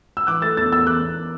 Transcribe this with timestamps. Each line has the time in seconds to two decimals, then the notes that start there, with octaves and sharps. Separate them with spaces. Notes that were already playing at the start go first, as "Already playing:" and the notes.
0.17 E6
0.27 E3 D6 F#6
0.42 A3 E6 A6
0.57 E2 E6 A6
0.72 E2 E6 A6
0.87 E3 D6 F#6
1.02 E2